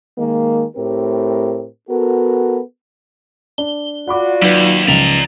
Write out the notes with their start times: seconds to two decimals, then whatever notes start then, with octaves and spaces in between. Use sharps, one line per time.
0.17 D#3 G#3 A#3
0.76 A2 C4 G4 A#4
1.89 B3 F#4 A4 A#4
3.58 D4 G7
4.08 F4 F#4 D5 F#5 B5 D6
4.42 D#2 F#3 D#4 B4
4.88 C#2 F3 D5 A#5